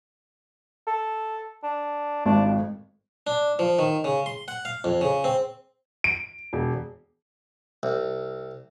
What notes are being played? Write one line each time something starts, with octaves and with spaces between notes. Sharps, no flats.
A4
D4
G#1 D4
F2
D4
F3
D#3
C#3
C6
F#5
F5
F2
C#3
C4
D7
E1
C2